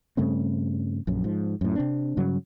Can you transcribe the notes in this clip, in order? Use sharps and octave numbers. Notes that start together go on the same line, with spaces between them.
G2 C#3 A3 C4
A#1 F#2
G#2 F3
F#2 A2
C3 C4 D4
G2 C#3 F#3